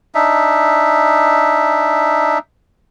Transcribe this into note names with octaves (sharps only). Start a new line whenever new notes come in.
D4 D#4 E5